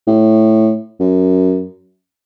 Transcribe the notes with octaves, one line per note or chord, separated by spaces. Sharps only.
A2
F#2